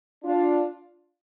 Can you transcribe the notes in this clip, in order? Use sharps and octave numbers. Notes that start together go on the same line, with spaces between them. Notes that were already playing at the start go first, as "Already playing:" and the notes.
D4 F4